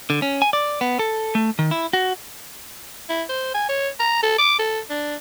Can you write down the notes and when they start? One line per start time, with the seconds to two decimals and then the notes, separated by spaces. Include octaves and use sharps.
0.10 D3
0.22 C#4
0.42 G#5
0.53 D5
0.81 B3
0.99 A4
1.35 A3
1.59 D#3
1.71 E4
1.93 F#4
3.09 E4
3.29 C5
3.54 G#5
3.69 C#5
4.00 A#5
4.23 A4
4.38 D6
4.59 A4
4.90 D4